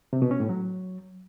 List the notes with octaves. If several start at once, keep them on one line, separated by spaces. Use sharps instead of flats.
C3
B2
C#4
A2
F#3